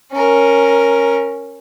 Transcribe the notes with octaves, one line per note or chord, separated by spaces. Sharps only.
C#4 A#4